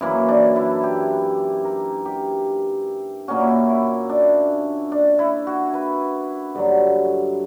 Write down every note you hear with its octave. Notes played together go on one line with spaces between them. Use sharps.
F#2 E3 A#3 E4
D4
E4
G4
A#4
G4
A#2 A#3 C#4 F#4
E4
F#4
E4
D4
D4
E4
F#4
B4
G2 D3 F#3